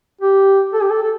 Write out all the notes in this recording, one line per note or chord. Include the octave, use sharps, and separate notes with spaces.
G4
A4
G4
A4
A4